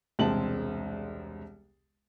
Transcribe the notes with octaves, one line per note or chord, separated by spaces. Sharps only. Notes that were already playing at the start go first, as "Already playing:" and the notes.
E1 C2 G#3 C4 A5 F#7